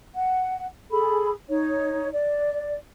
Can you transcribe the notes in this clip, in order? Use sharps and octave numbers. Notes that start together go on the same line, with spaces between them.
F#5
G#4 A4 B5
D#4 C#5
D5